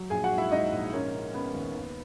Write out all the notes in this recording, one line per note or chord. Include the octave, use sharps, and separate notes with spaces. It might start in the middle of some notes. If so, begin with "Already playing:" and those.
Already playing: F#3
A#1 G#4 G#5
F#4 F#5
G#2
E4 E5
G#2 D#4 D#5
A#1
A#3 C#4 C#5
C#3
C#3 B3 B4
D#2
D#2